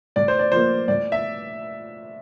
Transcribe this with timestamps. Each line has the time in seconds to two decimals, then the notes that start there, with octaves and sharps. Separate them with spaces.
0.16 A2 D5
0.28 C5
0.39 D5
0.52 F3 A#3 C5
0.88 A2 D5
1.12 E5